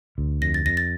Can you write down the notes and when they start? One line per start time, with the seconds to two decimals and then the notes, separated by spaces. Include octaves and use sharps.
0.18 D2
0.42 F2 A#6
0.54 A6
0.66 F2 A#6
0.77 A6